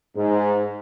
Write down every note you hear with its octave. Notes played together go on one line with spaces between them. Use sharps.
G#2